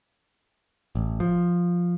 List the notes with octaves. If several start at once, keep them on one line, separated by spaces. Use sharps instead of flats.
A1
F3